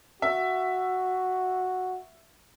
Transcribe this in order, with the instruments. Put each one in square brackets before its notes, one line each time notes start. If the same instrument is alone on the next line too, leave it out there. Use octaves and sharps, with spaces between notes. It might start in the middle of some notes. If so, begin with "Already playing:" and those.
[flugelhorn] F#4 [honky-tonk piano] E5